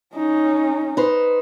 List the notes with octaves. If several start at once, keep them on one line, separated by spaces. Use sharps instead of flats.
C#4 D#4
D#4 B4 C5